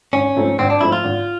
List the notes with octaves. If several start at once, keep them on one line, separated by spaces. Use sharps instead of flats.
G#1 C#4
G#2 F3 A3 C4
G#1 C4
D4
G#2 F3 A3 C4 E4
F4
G#1